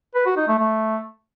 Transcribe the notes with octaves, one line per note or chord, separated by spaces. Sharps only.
B4
F#4
D#4
A3
A3